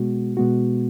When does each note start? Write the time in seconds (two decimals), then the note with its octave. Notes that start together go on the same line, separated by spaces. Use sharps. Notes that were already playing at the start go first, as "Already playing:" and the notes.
Already playing: B2 G#3 B3 F#4
0.37 B2 G#3 B3 F#4